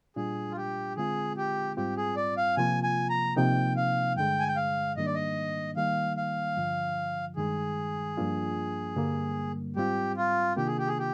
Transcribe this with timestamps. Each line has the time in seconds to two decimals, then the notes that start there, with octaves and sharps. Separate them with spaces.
0.16 A#2 G3 D4 F4 G#4
0.52 F4
0.57 G4
0.97 D3 G#3 C4 F4 G#4
1.37 G4
1.76 G#2 G3 C4 F4 G4
1.97 G#4
2.16 D5
2.37 F5
2.57 C3 F3 A#3 F4 G#5
2.83 G#5
3.10 A#5
3.37 C3 F3 A#3 D#4 G5
3.77 F5
4.16 G2 D3 G#3 G5
4.39 G#5
4.48 G5
4.56 F5
4.96 G#2 D#3 G3 A#3 D4 D#5
5.06 D5
5.15 D#5
5.76 D#3 G3 A#3 D#4 F5
6.17 F5
6.57 G2 D3 F3
7.36 G2 D#3 G#3 G#4
8.17 G2 F3 A#3 D4 F4
8.96 G2 D3 G3 A#3
9.76 G#2 G3 C4 F4 G4
10.17 F4
10.57 C3 D#3 A#3 D4 F4 G4
10.67 G#4
10.78 G4
10.87 G#4
10.99 G4